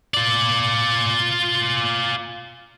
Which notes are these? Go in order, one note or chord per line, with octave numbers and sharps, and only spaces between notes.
F4 D5